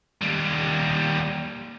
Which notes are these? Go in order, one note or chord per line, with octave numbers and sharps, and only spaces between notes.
D#2 G3